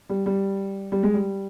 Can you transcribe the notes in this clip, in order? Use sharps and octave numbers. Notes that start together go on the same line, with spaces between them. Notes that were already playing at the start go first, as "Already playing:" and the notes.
G3
G3
G3
G#3
G3